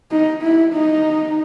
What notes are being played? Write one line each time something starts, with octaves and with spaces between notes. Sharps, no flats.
D#4
E4
D#4